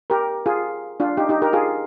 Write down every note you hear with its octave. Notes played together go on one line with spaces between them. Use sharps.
G4 A#4
F4 G#4
D4 F4
D#4 G4
D#4 G4
G4 A#4
F4 G#4